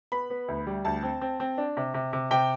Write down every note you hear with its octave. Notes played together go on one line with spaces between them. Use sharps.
B3 B5
B3
D2
G3
D2 A5
C4
C4
C4
D4
C3
C3
C3
C3 G5